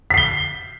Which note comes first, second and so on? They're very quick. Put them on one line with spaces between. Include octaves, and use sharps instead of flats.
B6 C7 G7